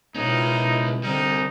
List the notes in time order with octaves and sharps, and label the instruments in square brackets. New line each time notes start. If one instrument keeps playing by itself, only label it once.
[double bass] B2 B3 [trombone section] D#3 F3 E4 [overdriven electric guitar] G#3 C#4 [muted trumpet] D#4
[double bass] D3 [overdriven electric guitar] G3 C4 [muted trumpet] D#4